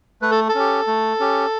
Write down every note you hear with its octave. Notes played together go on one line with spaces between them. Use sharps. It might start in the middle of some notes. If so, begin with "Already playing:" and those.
A3 B4
A4
A4
C#4 G4
A3
C#4 G4